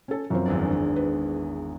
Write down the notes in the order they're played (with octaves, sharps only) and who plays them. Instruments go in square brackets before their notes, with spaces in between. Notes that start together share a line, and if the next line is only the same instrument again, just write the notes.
[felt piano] C#4 A4
F#2 F3 C4
[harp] G#1 E2 D4
[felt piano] B4